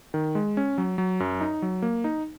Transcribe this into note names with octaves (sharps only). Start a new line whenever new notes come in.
D#3
G#3
C#4
F#3
F#3
F#2
D#4
F#3
A#3
D#4